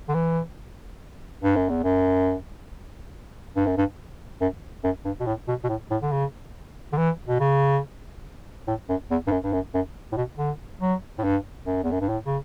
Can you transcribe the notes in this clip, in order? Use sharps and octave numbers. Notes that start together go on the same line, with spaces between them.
D3
E3
G2
F#2
E2
F#2
G2
F#2
G2
F#2
F#2
G2
B2
A2
B2
B2
A2
A2
D3
C#3
D3
E3
B2
C#3
A2
F#2
E2
G2
F#2
G2
F#2
F#2
A2
B2
D3
F#3
A2
G2
F#2
E2
F#2
G2
A2
C#3